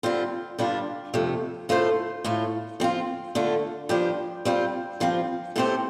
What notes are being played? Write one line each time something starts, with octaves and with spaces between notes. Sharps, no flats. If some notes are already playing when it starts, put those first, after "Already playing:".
D3 G3 C4 F4
G2 D3 G3 D4 F4
F2 C3 A3
A2 A3 F4 A4 C5
A2 A3 F4
F3 C4 F4
D3 A3 F4 A4
G2 F3 D4 G4 C5
G3 C4 F4 C5
G2 F3 C4 F4
A2 A3 C4 G4 C5